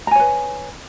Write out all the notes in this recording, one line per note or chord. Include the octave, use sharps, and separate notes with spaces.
B4 C#5 G#5 A#5